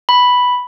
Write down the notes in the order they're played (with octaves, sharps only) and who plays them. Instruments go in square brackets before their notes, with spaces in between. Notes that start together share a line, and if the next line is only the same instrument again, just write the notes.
[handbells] B5